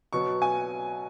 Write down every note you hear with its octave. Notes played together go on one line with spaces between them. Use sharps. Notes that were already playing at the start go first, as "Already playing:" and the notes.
B2 F#3 B3 C#6
G#5